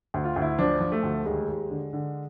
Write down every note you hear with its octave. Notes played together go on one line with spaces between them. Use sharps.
D2
F4
D2
E4
F3 D4
F3
A3
D2
D#2 G#3
D#2
D3
D3